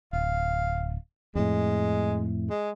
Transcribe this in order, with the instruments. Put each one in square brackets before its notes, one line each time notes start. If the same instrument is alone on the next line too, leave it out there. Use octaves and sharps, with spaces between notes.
[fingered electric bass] D1 [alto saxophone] F5
[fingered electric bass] F2 A2 [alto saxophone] G#3
[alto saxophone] G#3